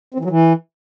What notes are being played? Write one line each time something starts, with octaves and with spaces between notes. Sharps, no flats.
C4
E3
F#3
E3